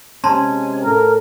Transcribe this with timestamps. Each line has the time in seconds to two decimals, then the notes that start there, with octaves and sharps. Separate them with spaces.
0.24 C3 G#3 C#4 A5 A#5 C6
0.84 A2 A4 A#4